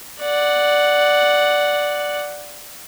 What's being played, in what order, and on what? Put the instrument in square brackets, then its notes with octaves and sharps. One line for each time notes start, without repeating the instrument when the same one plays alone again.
[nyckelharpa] D5 F#5